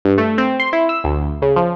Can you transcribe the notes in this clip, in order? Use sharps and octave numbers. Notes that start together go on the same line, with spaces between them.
G2
A3
C4
C6
E4
E6
D2
C#3
F3